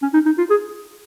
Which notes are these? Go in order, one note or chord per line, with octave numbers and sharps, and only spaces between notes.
C#4
D#4
D#4
F4
G#4